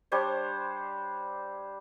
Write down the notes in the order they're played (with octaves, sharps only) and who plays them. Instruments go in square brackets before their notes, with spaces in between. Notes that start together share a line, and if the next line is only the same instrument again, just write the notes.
[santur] G3 D4 C5 C#5